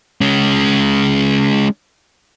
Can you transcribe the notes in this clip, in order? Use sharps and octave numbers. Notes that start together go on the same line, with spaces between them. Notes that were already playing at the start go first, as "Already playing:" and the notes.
G#3 C#4